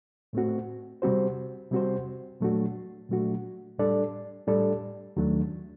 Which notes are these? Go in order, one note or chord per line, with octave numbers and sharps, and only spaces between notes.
A2 A3 C4 F#4
C3 G3 C4 F#4 C5
C3 G3 C4 F#4 C5
A#2 F#3 A3 D4 F#4
A#2 F#3 A3 D4 F#4
A2 G3 D4 A4 D5
A2 G3 D4 A4 D5
D#2 D#3 F#3 A3 D4